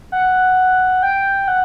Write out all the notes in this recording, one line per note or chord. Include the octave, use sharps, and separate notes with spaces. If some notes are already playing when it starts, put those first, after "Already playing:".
F#5
G5
F#5